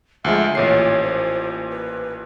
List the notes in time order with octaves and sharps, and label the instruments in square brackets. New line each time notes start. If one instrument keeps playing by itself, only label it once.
[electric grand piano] D2 F3 G#3 [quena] E5
[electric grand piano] A1 A#2 C7 [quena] C#5
[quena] C5
B4